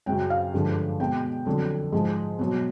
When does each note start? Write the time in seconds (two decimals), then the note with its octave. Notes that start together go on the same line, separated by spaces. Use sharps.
0.06 F#2 C#3 F#3 G5
0.30 F5
0.54 G2 D3 F3 G#3
1.00 B2 G#3 G5
1.46 F2 D3 F#3
1.92 G#2 F3 G#3
2.39 B2 F#3